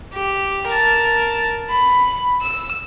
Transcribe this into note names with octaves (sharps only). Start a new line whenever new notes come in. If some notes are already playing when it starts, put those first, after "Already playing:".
G4
A#4 A5
B5
E6